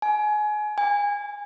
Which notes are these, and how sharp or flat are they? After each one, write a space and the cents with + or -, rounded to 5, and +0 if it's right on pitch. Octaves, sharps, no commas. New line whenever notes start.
G#5 +25
G#5 -25